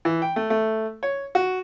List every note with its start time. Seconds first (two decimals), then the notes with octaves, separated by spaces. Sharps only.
0.05 E3
0.22 G5
0.36 A3
0.50 A3
1.03 C#5
1.35 F#4